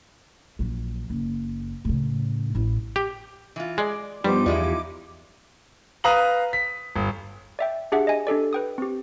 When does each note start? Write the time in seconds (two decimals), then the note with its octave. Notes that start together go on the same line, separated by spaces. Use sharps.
0.59 A#1 F#3
1.10 F#1
1.85 A2 C#3
2.55 A1 E4
2.96 G4
3.56 E3 F4
3.78 G#3 D5
4.24 G2 F3 G3 B3 D#4 G4 C5 D6
4.46 E2 F3 G#3 E4 F4 D5
6.04 B4 F5 A#5 D#6 F#7
6.53 B6
6.96 G1
7.59 D5 E5 G5
7.92 D4 G4 G#4 E5 F#5
8.07 D#5 G#5
8.27 D4 G4 A4 D5
8.53 B4 G5 D#6
8.78 C4 G4